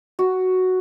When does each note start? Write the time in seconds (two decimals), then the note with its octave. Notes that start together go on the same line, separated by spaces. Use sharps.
0.19 F#4